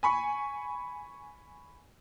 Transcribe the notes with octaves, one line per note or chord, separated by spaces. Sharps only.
G#5 B5 C#6